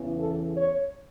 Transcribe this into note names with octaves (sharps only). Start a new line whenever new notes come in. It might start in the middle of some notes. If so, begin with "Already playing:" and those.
Already playing: E2 C#3 E3
A4
C#5